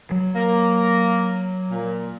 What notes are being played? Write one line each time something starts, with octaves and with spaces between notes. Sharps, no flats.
F#3
A#3
A#2